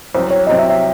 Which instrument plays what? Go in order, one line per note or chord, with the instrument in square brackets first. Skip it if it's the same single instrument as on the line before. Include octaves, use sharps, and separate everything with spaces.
[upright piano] C2 C3 F#3 C4 [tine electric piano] C5
[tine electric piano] C#5
[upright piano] C2 C3 F#3 C4 [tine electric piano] D#5
[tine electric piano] E5
E5